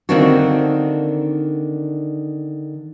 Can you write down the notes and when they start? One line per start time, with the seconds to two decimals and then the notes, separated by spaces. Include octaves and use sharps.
0.09 D3 D#3 A#3 C4 D4 F#4